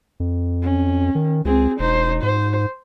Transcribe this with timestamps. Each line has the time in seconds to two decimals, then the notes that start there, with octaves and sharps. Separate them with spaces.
0.20 F2
0.62 C#4
1.15 D#3
1.45 C#2 C4 G#4
1.79 E1 D#4 C5
2.23 G#2 C5